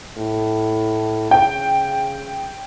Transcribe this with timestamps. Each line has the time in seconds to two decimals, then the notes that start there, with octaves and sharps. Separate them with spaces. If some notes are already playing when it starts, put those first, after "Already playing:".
0.18 A2
1.31 C#3 G5